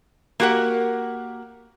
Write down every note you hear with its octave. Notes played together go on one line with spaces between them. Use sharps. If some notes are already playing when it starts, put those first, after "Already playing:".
A#3 F#4 G4 A#4 F#5